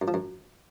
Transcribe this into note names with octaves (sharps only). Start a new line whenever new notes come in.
F#2
F3
F#2